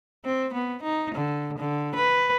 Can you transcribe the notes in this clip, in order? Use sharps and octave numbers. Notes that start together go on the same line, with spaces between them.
C4
B3
D#4
D3
D3
B4